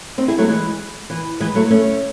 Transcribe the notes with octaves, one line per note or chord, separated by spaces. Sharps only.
C4 D#4
E4 G#4
F#3 A3
E3 G#3
E3
E3 G#3
F#3 A3
A3 C#4